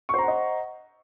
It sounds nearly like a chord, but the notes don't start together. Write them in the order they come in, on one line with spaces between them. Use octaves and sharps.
C#6 C5 A#5 F#5 D#5